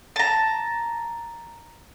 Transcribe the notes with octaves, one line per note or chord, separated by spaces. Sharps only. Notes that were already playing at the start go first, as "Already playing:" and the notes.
A5 A#5